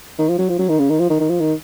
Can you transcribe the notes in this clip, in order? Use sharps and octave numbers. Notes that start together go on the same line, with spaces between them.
D#3
F3
F#3
F3
F#3
D#3
C#3
D#3
F3
D#3
D#3
F3
D#3